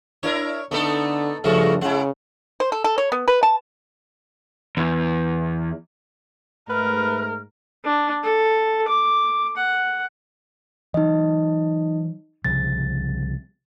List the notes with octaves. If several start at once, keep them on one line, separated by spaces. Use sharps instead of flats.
D4 E4 A#4 C#5
D3 A3 B3 D#4 A4
G2 C#3 F3 G#3 A3 F4 F#4
C#3 G#3 E4 F#5
C5
A4
A4
C#5
B3
B4
A5
E2
G#2 A3 A#4 B4 F6
D4
A4
D6
F#5
E3 F#3 D#4 D#5
C2 C#3 F3 A6